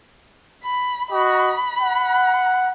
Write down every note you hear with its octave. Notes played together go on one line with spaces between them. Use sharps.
B5
F#4 D#5 B5
F#5